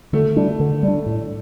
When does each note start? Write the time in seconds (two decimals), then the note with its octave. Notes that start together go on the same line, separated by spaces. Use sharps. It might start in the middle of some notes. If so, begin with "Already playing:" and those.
0.13 D3 A3
0.36 G3 D4
0.60 D3
0.83 G3
0.88 D4
1.06 A2